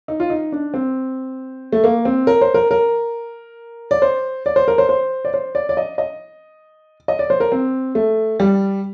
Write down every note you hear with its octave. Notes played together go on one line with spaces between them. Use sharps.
D#4
F4
D#4
D4
C4
A3
A#3
C4
A#4
C5
A#4
A#4
D5
C5
D5
C5
A#4
C5
C5
D5
C5
D5
D5
D#5
D#5
D#5
D5
C5
A#4
C4
A3
G3